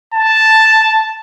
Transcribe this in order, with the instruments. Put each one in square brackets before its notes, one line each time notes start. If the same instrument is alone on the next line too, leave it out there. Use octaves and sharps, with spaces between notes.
[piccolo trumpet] A5